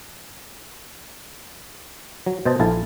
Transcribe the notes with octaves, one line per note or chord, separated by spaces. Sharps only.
F#3
B2 C5 D#5 A5
A#1 E4 F4 A4 A5